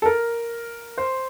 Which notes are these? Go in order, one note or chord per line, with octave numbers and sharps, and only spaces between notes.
A4
A#4
C5